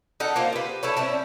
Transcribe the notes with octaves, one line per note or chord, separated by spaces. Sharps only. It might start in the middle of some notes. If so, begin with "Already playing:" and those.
D#4 A4 F#5
A#3 F4 C5 F5
G4 B4
E4 A4 B4 C#5
G3 C4 C#4 E4